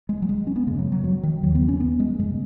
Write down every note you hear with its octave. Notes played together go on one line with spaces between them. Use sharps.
G#3
F#3
G#3
C#4
B3
F#2 C#3 G#3
F#3
F#3
F#3
D#3
D#2 C#3 F#3
B3
C#4
B3
G#3
F#2 C#3 G#3